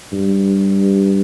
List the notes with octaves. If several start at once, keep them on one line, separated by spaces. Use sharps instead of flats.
G2